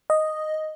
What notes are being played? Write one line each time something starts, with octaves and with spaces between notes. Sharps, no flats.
D#5